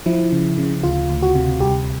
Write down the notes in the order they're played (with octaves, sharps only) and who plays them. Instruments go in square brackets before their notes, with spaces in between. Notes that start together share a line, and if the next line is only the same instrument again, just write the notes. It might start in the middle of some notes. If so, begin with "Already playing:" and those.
[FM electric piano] F3 E4
C#3
C#3
D2 F4
D2
F#4
C3
C2 G4